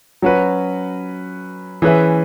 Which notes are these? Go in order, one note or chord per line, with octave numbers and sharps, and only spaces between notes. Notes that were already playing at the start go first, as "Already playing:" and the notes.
F#3 C#4 F#4 B4
E3 C#4 G#4 B4 E5